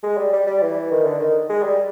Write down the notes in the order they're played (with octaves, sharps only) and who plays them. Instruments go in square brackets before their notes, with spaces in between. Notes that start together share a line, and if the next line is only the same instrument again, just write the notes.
[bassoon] G#3
G3
G3
G3
E3
D#3
D3
D#3
G#3
G3